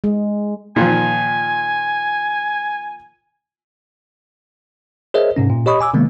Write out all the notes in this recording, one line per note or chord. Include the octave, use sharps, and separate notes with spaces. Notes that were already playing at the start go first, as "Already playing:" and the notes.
G#3
A#2 D#3 F3 G#5
G#4 A#4 C5 C#5 D#5 E5
G#2 C3 C#4
A#2
G4 C#5 D#5 B5 C#6 D#6
G#5 D6 E6
C3 D#3 G#3 A#3 B3